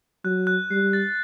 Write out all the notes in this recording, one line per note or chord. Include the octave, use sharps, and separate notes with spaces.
F#3 F#6
F#6
G3 C7
A6